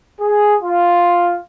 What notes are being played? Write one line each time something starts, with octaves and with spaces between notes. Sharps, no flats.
G#4
F4